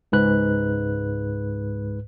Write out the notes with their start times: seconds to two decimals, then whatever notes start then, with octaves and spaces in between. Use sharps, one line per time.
0.12 C#2 G#2 B4 F#6